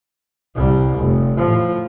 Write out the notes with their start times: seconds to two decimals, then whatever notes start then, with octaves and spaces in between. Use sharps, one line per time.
0.55 C2 G3
0.99 F1
1.37 A2 F3